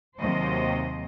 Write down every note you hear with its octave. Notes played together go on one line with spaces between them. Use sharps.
D#2 C3 F#3 C5 D#5